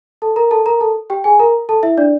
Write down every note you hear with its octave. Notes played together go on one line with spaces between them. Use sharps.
A4 A5
A#4 A#5
A4 A5
A#4 A#5
A4 A5
G4 G5
G#4 G#5
A#4 A#5
A4 A5
E4 E5
D4 D5